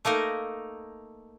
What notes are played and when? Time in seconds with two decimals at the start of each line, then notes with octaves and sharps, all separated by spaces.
0.05 A3 A#3 D#4 A#4